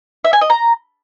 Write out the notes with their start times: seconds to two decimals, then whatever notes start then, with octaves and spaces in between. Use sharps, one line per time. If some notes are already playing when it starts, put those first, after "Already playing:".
0.25 E5
0.33 G#5
0.41 D#5
0.50 A#5